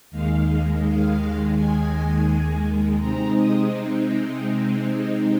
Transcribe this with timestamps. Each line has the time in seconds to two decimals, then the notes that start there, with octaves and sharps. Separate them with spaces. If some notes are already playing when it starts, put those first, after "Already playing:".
0.11 D#2 D#3 G#3 F5
0.84 F5
1.55 G#5
3.00 C3 G#3 C4 D#4 A#5
3.36 D#6